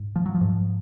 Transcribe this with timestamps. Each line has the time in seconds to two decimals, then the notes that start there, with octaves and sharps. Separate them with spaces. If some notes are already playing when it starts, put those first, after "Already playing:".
Already playing: G#2
0.16 F3
0.26 F#3
0.35 F3
0.41 G#2